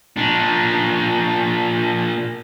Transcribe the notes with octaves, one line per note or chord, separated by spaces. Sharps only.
A#2 D4